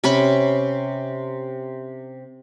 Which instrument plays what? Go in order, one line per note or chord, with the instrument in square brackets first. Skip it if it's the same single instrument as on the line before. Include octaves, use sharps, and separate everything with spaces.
[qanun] C3 C#4 B5 C#6